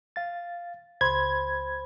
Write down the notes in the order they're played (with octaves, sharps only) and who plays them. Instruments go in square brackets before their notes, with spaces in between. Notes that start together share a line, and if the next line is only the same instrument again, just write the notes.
[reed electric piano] F5 A6
[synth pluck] C#2 [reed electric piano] C5 B5 C6 [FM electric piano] G#6